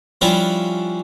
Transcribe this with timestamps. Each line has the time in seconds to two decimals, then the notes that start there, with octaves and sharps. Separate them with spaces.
0.21 F3 G3 C#4 D4 E4 F4